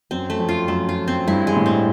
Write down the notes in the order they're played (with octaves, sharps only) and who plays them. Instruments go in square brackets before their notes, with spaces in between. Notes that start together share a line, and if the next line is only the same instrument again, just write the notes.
[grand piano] F#2 [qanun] C4
[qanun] A3
[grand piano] F2
[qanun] F4
[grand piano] F#2 [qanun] A3
[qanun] F4
C4
[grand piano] G2 [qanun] E4
[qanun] G#3
[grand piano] A2
[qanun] C4